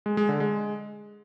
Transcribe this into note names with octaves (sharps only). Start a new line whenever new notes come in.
G#3
G#3
D3
G#3